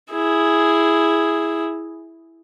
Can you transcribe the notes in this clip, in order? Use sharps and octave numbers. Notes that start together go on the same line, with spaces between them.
E4 G#4